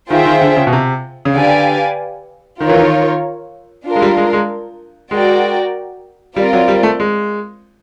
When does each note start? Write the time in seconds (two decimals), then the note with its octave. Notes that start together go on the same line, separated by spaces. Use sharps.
0.10 D#3 F4 G#4 C5 E5 G5
0.26 D#3
0.41 D3
0.56 C#3
0.67 B2
0.73 C3
1.25 C#3
1.35 D3 G4 B4 D5 F5 G#5
2.60 D#3 F4 A#4 C#5
2.69 E3
2.79 D#3
3.86 D4 F4 A#4
3.96 G#3
4.02 G3
4.17 G#3
4.33 G#3
5.11 G#3 F#4 A#4 D5 G5
6.36 G3 C4 F4 A#4 D5
6.53 F#3
6.68 G3
6.83 A3
7.00 G#3